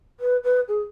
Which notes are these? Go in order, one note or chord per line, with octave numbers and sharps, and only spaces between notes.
B4
B4
G#4